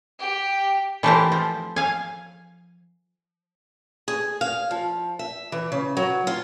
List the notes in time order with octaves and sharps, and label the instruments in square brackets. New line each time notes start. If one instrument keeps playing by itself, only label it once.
[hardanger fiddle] G4 G5
[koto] E3 A3 C4 G4 A#4 C5
F3
F5 G#5
[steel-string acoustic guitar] G#4
F5
F3
E5
E3
C#3
F#3
F4